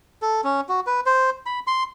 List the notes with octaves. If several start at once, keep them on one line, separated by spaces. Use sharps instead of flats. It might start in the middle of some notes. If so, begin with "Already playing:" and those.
A4
C#4
F#4
B4
C5
B5
C6